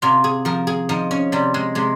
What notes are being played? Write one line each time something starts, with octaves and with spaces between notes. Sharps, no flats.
C3 F4
G#4
F3 A#4
G#4
F3 D#4
C#4
C3 G3
G#3
C3 G#3